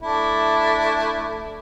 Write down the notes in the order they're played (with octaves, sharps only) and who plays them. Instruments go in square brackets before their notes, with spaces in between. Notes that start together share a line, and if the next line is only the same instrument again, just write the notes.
[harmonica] A3 D4 E4